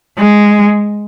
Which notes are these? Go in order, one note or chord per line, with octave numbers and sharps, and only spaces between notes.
G#3